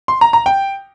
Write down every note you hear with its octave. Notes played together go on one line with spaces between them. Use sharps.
C6
A#5
A#5
G5